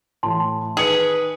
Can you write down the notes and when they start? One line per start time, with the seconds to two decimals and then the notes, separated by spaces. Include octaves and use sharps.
0.23 A2 E3 A5 C6
0.77 D#3 G#4 B4 C#7